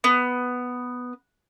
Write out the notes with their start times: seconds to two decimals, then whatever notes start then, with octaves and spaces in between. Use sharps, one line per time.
0.04 B3